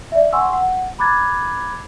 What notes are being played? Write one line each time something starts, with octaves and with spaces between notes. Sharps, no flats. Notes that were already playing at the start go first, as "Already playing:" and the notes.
D5 E5
F#5 G#5 C6 C#6 E6
F#5
A#5 B5 D6 F#6 G#6 A6